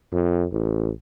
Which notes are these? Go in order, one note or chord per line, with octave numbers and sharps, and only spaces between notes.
F2
A1